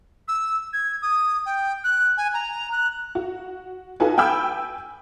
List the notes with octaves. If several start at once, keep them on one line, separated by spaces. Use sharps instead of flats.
E6
G#6
D#6
G5
F#6
G#5
A#5
F#6
F#4
D#4 F4 F#4 A4 B4 G#5
G5 G#5 B5 E6 G6